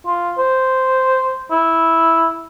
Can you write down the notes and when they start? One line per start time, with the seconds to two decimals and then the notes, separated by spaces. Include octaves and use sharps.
0.06 F4
0.38 C5
1.51 E4